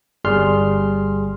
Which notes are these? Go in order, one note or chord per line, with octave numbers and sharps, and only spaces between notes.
G1 G3 G#4 C6 F6